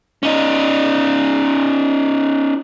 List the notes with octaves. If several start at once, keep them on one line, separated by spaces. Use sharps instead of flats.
C#4 D#4